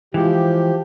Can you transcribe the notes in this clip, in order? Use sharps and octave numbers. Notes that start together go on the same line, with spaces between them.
E3 F3 G#3 G4